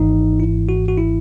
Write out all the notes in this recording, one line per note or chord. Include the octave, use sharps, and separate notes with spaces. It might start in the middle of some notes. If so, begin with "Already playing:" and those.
Already playing: G#1 G#2 E3 D#4
E4
F#4
F#4
E4